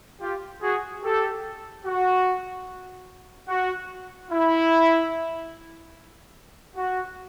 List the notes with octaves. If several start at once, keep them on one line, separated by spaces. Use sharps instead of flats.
F4 G4
F#4 G#4
G4 A4
F#4
F#4
E4
F#4